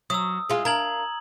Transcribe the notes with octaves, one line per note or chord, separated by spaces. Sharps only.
F#3 D#6 E6
G#3 F4
D4 A#4 A#5 G#6 F#7